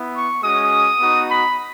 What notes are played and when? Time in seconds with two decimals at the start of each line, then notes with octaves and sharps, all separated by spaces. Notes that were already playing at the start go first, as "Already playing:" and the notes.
Already playing: B3 E4
0.13 C#6
0.42 G#3 C#4 F#4 D#6
1.00 B3 D#4 F#4
1.30 B5